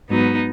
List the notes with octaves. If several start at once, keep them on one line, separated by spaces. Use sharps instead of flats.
G#2 F#3 B3 D#4